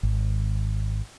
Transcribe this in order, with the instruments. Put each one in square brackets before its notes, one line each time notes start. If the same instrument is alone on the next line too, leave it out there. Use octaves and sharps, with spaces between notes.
[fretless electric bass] G#1